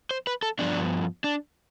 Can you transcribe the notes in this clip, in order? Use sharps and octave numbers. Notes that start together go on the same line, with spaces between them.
C5
B4
A4
G2 F3 B3 D4
D4